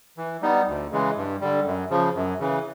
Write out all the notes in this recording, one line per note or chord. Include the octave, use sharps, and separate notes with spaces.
E3
G3 B3 D#4
D2
C#3 E3 G#3
G2
D3 G3
F#2
C#3 F3
F#2
C#3 E3